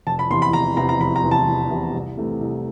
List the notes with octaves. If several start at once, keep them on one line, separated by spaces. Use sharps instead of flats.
F1 A5
B5
E2 C3 E3 C6
B5
F1 A#5
E2 C3 E3 A#5
A#5
F1 B5
A#5
E2 C3 E3
A5
F1
E2 C3 E3
C2
C3 E3 A3
C2